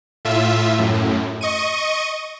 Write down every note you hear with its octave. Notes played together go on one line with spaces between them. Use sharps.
A2 F4 E5
F#2 A2
D#5 C#6 D#7